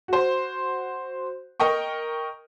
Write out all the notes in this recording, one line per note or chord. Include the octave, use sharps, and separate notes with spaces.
F#4 C5
A#4 D#5 G5 C#6